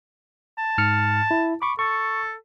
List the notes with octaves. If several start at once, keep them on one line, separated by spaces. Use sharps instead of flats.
A5
G#2 F6 C#7
E4
B5 C#6 D6
A4 C#6